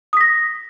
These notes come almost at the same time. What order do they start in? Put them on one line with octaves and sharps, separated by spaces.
D#6 B6 A#6